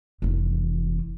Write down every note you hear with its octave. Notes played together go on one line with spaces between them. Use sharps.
F1 E3